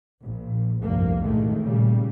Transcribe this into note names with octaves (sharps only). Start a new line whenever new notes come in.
A#1
F1 C2 G2 A#3
A1 A#2 D#3 G#3 A3
A#2 C#3 G3